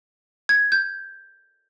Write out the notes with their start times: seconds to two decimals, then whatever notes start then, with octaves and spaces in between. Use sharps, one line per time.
0.49 G#6
0.72 G6